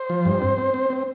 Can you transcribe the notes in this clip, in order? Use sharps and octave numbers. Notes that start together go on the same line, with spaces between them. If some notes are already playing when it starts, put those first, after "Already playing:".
Already playing: C5
F3
G2
C4
C4
C4
C4